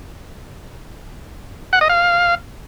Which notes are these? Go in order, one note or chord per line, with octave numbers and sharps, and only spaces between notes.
F#5
D#5
F5